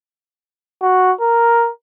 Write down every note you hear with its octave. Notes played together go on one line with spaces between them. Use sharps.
F#4
A#4